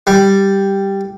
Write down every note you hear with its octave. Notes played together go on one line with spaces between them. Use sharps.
G3